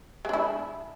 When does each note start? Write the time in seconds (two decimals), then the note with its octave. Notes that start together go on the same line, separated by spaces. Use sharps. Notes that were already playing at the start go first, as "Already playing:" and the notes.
0.25 G#3
0.29 D4
0.33 E4